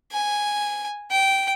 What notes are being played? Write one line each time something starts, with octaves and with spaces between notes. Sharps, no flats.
G#5
G5